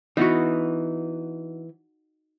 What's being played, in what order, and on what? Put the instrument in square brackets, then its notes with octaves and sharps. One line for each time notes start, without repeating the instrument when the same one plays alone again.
[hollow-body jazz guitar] E3 B3 [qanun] D#4 F#4